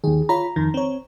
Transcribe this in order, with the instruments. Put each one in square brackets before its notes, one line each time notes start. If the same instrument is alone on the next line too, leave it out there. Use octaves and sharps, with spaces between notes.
[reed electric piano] D#2 D#3 [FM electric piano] G#4
[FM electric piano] F4 C#5 B5 [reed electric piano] A#5
[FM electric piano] F2 D#3
C4 C#5